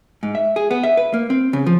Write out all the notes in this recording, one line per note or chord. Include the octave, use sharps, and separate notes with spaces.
G#2
E5
G#4
B3
E5
B4
A#3
C4
C#3
F3